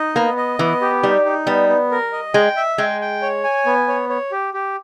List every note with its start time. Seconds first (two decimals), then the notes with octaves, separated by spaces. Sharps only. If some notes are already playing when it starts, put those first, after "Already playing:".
Already playing: D#4 D#5
0.15 A#3 B3
0.37 D#5
0.59 E3 B3
0.81 G4
1.03 G3 D#4
1.25 D#4
1.46 G3 B3
1.69 B3
1.91 A#4
2.13 D#5
2.34 G#3 G5
2.56 E5
2.78 G#3 G5
3.01 G5
3.22 C#5
3.44 G#5
3.66 B3
3.88 C#5
4.09 C#5
4.32 G4
4.54 G4